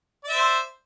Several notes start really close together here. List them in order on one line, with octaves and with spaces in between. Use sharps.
D5 E5 C5